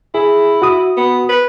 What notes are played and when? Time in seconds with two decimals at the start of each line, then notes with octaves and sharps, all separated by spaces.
0.15 E4 G#4
0.62 F#4 D#6
0.97 B3
1.29 B4